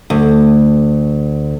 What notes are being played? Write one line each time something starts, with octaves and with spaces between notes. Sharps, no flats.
D2